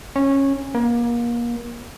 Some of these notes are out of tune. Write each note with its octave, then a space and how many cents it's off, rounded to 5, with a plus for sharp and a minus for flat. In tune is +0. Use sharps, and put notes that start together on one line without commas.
C#4 -15
A#3 +30